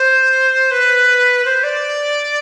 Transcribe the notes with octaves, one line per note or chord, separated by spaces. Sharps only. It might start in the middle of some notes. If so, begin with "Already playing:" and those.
Already playing: C5
B4
C5
D5